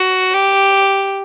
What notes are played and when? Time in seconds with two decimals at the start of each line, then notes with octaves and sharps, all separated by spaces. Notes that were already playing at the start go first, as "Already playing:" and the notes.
Already playing: F#4
0.34 G4